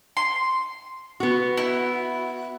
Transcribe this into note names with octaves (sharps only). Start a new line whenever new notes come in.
C6
B3 F#4
E4